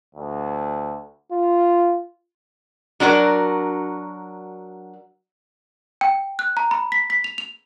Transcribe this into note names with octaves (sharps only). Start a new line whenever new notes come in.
D2
F4
F#3 D4 F#4 A#4
G5
F#6
A#5
B5
B6
B6
F7
F7